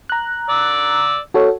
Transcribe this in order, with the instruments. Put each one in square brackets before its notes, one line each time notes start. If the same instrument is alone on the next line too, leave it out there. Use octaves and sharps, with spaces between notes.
[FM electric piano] A#5 F#6
[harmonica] D5 E6
[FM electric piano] F#4 A4 C#5